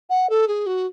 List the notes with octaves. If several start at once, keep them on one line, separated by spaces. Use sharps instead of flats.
F#5
A4
G#4
F#4